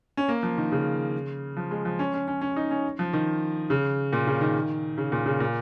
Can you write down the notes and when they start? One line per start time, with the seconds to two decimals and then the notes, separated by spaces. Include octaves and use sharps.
0.17 C#4
0.28 A#3
0.43 F3
0.57 D#3
0.72 C#3
1.57 F3
1.71 G#3
1.85 F3
1.99 C#4
2.14 C#4
2.28 C#4
2.41 C#4
2.56 D#4
2.71 C#4
2.99 F3
3.13 D#3
3.70 C#3
4.13 A#2
4.27 C#3
4.41 D#3
4.98 C#3
5.12 A#2
5.26 C#3
5.40 A#2